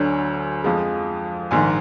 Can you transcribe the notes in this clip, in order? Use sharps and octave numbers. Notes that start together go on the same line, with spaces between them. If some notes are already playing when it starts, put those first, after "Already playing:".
Already playing: D2 D3 F#3 G#5
F2 F3 G#3
A#1 G#2 D#3 G#5